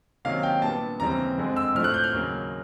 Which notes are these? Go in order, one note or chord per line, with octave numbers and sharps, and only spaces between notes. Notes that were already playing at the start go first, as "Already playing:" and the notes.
C3 D#3 F#3 A#3 C#4 F5
G5
A#2 G3 B3 D4 A5
D#2 C#3 E3 G3 C4 A#5
F2 D3 F3 G#3 C4
E6
A2 F3 A3 D4 F6
F#6
G6
F6
D#2 C#3 F#3 A#3